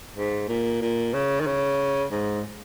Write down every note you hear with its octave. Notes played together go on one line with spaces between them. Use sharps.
G#2
A#2
A#2
C#3
D#3
C#3
G#2